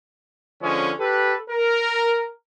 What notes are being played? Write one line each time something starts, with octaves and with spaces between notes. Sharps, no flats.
D3 F3 G#3 C#4
G4 A4 B4
A#4